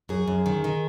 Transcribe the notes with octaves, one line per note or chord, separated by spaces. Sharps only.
F#2 G#4
F#2
D#3
D#3